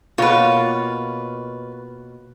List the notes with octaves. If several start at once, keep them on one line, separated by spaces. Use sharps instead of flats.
B2 A#3 F4 B4 C#5